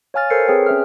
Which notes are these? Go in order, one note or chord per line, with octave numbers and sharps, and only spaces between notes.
C#5 F5 G#5 F6 A6
A4 A#4 C5 C#5 C7 C#7
C4 G#4 B4 C#5 G5
C#4 E5 F6